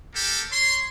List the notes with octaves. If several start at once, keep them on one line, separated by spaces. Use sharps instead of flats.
A#3 G4 A4
C#5 C6